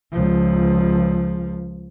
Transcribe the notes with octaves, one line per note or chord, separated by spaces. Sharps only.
C#2 F3